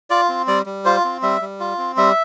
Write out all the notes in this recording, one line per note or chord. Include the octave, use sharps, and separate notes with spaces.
F4 D5
C4
G3 D5
G3
F4 C5
C4
G3 E5
G3
F4
C4
G3 E5